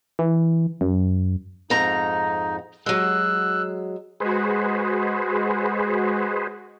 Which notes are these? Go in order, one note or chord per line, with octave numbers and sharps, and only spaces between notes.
E3
F#2
F2 G#2 D#4 A#5
F#3 G#3 E6 F#6
G#3 F#4 G#4 B4 C5